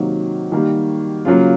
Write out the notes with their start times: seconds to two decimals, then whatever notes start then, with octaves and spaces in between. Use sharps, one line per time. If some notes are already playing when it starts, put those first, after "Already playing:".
Already playing: C3 D#3 F#3 A#3 F#4
0.52 D#3 G3 A#3
1.25 C#3 F#3 A#3 F4